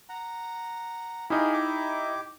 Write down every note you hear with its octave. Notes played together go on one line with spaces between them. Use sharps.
F#5 A#5
D#4 E4 G4 G#4 F5
G4 D6